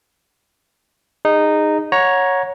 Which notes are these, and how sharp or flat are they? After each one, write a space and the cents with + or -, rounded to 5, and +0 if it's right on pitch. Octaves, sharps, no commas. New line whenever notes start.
D#4 -15 G#4 -20
C#5 +0 F#5 -20 A#5 +15